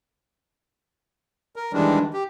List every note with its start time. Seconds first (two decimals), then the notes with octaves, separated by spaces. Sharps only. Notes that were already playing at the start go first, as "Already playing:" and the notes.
1.56 A#4
1.73 D#3 E3 G3 G#3 D4
2.13 G4